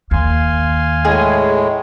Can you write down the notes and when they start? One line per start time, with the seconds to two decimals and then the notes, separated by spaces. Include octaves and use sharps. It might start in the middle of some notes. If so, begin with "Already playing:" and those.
0.11 D#2 F5 G#5 C6
1.05 A2 G#3 G#4